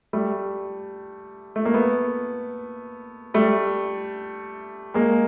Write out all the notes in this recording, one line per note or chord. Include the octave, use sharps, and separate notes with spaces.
G3 A3
A3
A#3
A3 B3
G3 A3
G#3 A#3